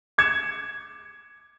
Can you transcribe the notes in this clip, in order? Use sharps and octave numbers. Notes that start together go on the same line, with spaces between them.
D6 G#6 C#7 E7